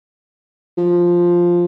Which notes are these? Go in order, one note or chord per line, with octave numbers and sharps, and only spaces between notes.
F3